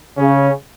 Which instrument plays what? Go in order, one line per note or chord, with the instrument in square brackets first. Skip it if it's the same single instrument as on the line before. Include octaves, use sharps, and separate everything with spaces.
[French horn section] C#3 [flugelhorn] C#4